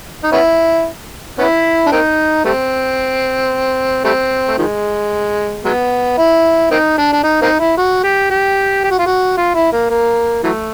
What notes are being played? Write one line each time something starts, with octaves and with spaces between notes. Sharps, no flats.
D#4
B3 C#4 E4
B3 C#4 E4
D4
A#3 C4 D#4
G3 A3 C4
G3 A3 C4
A3
D#3 F3 G#3
F#3 G#3 B3
E4
A#3 C4 D#4
D4
D4
D#4
A#3 C4 D#4
E4
F#4
G4
G4
G4
F#4
F4
F#4
F4
E4
A#3
A#3
E3 F#3 A3